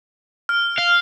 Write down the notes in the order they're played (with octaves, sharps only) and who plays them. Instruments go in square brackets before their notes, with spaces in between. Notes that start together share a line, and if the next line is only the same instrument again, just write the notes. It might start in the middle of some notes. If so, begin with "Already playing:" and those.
[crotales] F6
[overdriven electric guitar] F5